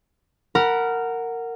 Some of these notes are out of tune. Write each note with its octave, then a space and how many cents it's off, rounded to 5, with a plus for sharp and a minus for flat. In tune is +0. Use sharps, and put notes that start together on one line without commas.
A#4 -15 F#5 +0 B5 -25